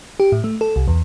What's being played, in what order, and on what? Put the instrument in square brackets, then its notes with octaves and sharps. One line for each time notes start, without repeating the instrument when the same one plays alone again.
[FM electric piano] G4
A2
A3
A4
C2
E2